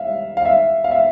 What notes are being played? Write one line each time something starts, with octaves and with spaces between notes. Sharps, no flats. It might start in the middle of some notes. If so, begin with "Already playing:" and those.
Already playing: E5 F5
F5
E5
F5
E5